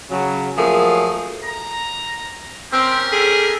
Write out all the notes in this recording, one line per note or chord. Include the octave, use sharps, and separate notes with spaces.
C#3 F#3
F3 F#3 A3 A#3 G#4
A#5
C4 C#4 G4 A#4
G#4 A4